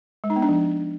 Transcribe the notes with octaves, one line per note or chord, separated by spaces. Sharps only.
G#3
D#4
B3
D4
F3